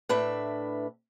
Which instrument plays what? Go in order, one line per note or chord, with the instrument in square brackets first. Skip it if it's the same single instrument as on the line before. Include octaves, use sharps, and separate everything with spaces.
[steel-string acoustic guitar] A2 D4 B4 E5